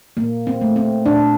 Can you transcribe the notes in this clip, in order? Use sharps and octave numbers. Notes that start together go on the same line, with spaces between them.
A#2 A#3
C4
A3
C4
A#2 D4